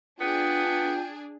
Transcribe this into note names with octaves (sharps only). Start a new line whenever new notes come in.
B3 D4 F4 G#4 G5